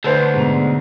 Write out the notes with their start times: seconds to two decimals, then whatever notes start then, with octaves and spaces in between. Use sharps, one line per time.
0.04 D2 A4 B4 C5
0.34 G#2 B2 F7